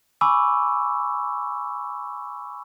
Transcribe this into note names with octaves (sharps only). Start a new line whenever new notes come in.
G#5 B5 C#6 D6 E6